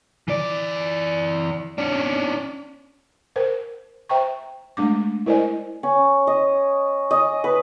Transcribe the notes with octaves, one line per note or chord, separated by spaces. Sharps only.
E3 D5
C#4 D4
A#4 C5
C5 E5 G5 A#5 C#6
G#3 A3 D4 D6
E4 A#4 C5 D5 D#5 G#5
C#4
D#5
D#5
B4